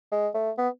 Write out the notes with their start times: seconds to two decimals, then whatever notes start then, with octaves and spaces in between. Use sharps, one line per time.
0.12 G#3
0.35 A3
0.58 B3